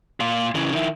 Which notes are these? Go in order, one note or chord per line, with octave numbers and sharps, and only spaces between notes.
A#2 F4
C#3 E3
D#3 E4